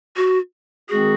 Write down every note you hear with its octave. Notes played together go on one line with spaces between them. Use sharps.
F#4
D#3 G#3 C4 F#4 G#4